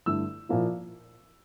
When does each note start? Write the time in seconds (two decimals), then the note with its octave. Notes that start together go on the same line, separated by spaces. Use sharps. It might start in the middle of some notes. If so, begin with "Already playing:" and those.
0.06 G2 D3 A3 E4 E6
0.49 A#2 F3 A#3 E4